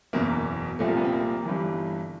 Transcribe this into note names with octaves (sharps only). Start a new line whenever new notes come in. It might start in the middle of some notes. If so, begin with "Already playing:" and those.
F#1 E2 B2 A#3
C2 A#2 F3 A3
A#3
B3
C4
A#3
G1 G2 E3